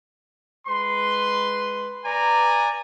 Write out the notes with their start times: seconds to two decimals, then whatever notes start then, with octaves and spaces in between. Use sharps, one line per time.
0.67 G#3 B4 C6
2.05 B4 D5 G#5 A#5